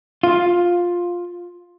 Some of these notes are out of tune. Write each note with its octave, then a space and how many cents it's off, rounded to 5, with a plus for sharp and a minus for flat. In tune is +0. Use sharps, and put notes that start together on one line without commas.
F4 +10